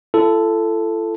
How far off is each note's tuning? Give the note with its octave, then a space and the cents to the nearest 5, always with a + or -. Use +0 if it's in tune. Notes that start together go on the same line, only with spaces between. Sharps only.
E4 +45 A4 +0